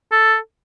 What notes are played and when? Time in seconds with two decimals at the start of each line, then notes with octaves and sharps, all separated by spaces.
0.12 A4